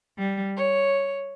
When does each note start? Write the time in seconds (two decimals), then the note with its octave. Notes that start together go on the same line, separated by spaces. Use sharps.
0.19 G3
0.56 C#5